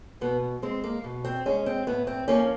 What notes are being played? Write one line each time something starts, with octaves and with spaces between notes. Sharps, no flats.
B2 B3
G#3 C4
A#3
B2
C4
G#3 C#4
C4
A2 B3
C4
F3 A#3 C#4